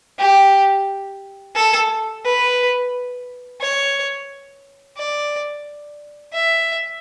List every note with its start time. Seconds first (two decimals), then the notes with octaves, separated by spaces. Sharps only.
0.19 G4
1.55 A4
2.25 B4
3.61 C#5
4.97 D5
6.33 E5